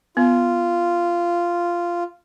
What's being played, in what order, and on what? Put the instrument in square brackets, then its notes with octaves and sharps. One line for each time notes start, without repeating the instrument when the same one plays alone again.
[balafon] B3 [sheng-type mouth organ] F4